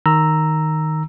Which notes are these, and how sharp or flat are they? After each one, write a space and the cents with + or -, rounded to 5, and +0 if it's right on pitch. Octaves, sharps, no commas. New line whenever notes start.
D#3 +0 A#5 +0 E6 +0